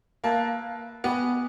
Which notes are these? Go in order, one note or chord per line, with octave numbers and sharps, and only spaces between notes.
A#3 B4 E5 A5
B3 G4 B4 D#5 G#5